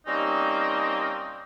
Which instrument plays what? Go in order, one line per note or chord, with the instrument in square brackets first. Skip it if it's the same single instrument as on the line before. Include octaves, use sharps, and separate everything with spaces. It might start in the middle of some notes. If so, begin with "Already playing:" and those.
[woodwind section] G3 A#3 C4 C#4 D#4